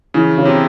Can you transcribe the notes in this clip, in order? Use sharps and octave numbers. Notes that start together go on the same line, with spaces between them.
C#3 E3
C#3
C3